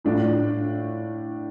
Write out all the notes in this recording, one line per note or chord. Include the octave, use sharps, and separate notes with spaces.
A2 A3 D4 F4